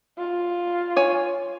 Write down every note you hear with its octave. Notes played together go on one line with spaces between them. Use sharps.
F4
C#5 G#5